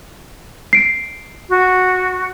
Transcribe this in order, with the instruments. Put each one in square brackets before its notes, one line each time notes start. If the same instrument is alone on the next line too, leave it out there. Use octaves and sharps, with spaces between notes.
[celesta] C7 D7
[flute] F#4